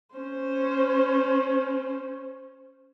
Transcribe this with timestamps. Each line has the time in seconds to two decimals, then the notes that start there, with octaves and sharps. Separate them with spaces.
0.15 C#4 C5